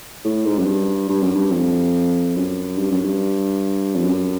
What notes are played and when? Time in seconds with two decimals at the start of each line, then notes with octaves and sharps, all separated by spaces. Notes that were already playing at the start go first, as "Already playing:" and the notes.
0.25 A2
0.46 G#2
0.59 F#2
0.67 G2
1.09 G2
1.22 F#2
1.36 G2
1.51 F2
2.36 F#2
2.78 G2
2.91 F#2
3.04 G2
3.95 F2
4.05 F#2